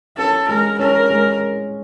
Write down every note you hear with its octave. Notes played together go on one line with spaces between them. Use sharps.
C#4 A4
G#3 A#4
C#4 A#4
G#3